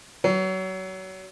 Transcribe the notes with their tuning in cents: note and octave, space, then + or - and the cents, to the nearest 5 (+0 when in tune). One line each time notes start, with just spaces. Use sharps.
F#3 +30